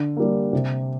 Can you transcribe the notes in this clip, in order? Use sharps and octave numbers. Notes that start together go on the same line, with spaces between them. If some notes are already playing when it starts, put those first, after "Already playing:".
Already playing: D3
G3 A#3
C3